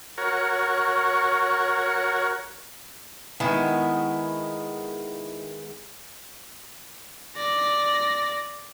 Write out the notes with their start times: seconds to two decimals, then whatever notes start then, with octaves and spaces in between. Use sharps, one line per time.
0.18 F#4 A#4 C#5
3.40 D#3 G#3 B3 E4
7.36 D5 A#6